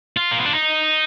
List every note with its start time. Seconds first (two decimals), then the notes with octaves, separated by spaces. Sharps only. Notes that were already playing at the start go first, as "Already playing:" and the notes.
0.17 F4
0.31 A#3
0.39 B3
0.46 D4
0.53 D#4